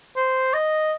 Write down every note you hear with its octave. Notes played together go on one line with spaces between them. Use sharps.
C5
D#5